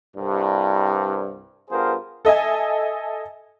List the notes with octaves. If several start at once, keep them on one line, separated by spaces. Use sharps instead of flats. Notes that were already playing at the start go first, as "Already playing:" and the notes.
C2 G2
G2 B3 F4 G#4 A#4 C5
A4 D#5 E5 G#5